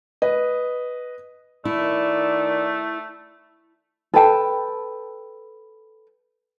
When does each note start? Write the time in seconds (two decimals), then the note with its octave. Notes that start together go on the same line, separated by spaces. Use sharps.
0.22 B4 D#5
1.65 D#3 A3 E4 D5
4.14 A4 B4 G5 A5